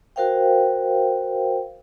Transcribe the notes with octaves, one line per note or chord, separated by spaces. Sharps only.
F#4 A#4 C5 F5 G5